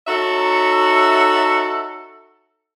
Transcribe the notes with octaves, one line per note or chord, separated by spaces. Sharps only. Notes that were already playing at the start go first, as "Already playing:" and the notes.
D#4 F#4 A4 C#5 E5